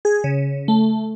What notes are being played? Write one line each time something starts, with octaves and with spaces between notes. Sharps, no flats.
G#4
C#3
A3